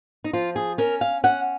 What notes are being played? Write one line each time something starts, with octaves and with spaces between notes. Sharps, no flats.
D#4
F3 F4
G#4
C#4 A#4
F5
C#4 F#5